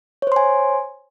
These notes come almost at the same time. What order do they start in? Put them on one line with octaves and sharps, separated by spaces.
C#5 C5 C6 G#5